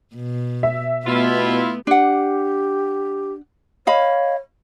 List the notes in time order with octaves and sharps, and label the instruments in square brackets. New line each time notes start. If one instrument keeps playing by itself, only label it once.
[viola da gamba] B2
[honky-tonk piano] E5
[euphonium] B2 [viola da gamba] A3 B3 [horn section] E4 F4
[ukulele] D4 F#5 [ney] G4
[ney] C#5 [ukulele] D#5 F5 B5